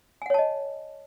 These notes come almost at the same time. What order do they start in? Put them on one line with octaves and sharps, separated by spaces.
G#5 F#5 C#5 A5 D#5